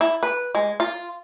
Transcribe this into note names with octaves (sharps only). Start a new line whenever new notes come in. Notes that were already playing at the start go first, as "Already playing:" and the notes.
E4
B4
G#3
F4